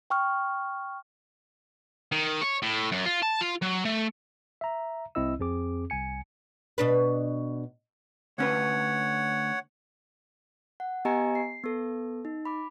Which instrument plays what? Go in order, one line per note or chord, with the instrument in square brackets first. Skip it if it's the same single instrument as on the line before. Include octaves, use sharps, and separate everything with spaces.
[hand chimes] G5 C#6 F6
[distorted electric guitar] D#3
C#5
A2
F#2
F4
A5
F4
F#3
A3
[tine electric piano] E5 A#5
C2 C4 E4 D#5 E6
F2 C4 G#4 D6
C2 G#5 C#7
[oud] B2 D4 B4
[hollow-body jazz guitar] D2 C#4 B4 [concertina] C#5 F#5
[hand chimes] F#5
B3 G4 D#5 G#5 A#5 C#7
C7
B3 A4
D#4
B5 D6